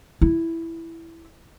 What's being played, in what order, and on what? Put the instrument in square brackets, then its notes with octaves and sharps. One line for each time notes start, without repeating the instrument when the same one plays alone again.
[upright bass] E4